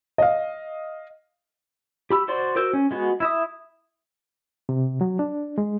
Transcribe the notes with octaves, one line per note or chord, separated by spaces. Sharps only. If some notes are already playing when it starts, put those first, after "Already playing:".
D#5 F5
G4 B5 E6
F#4 C5 D5 C6
F#4 A#4 C5 E6 G6
C#4
G#3 B3 F#4
E4 E5 D#6
C3
F#3
D4
G#3